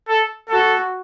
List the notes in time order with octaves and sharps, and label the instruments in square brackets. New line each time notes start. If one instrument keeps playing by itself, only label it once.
[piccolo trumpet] A4
[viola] F#4 [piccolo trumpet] A4